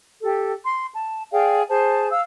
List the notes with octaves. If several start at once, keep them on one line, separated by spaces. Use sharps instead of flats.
G4 A4
C6
A5
G#4 D5 F5 G5
G#4 C5 A5
F5 E6